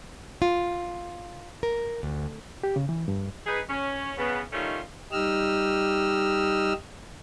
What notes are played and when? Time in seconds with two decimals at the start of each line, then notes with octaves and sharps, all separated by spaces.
0.42 F4
1.63 A#4
2.03 D2
2.63 G4
2.76 C#3
2.89 E3
3.08 G2
3.46 D#4 G#4 B4
3.70 C#4
4.18 C#3 B3
4.53 D#3 G3 A3 C#4 D#4 F4
5.12 G3 D#4 G4 D#5 E6 F6